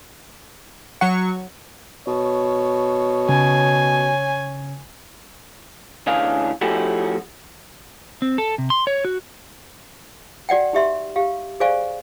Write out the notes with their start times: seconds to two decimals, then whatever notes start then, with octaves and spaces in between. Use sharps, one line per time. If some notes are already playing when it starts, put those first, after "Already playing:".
1.01 F#3 F#5 C#6
2.07 B2 C#5
3.29 C#3 G#5
6.07 D2 E3 C#4 D4 G#4 F5
6.61 F3 A3 C#4 E4 F#4 G4
8.22 C4
8.38 A4
8.58 C3
8.70 C6
8.87 C#5
9.05 F#4
10.49 F#4 D5 F#5 G5
10.73 D#4 G4 E5 C6
11.16 G4 F5
11.60 G#4 C5 D5 F5 G#5 C#6